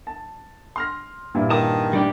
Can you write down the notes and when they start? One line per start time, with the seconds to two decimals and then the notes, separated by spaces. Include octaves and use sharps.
0.07 A5
0.76 C6 F6 A#6
1.34 G2 A#2 E4
1.50 D#3 A5 D#6
1.93 G3 D4 G4